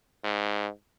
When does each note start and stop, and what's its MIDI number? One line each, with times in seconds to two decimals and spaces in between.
0.24 0.68 44